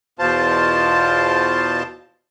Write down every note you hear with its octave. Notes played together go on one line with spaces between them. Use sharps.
E2 B2 F4 C5 A5